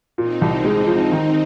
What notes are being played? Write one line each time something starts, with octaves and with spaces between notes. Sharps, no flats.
A#2 C4 D#4
C2
G#3
F3
D#3